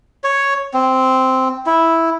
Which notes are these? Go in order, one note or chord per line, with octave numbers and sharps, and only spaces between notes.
C#5
C4
E4